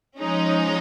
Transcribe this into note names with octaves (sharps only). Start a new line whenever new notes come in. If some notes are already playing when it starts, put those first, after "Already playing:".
F3 G#3 C#4 D#4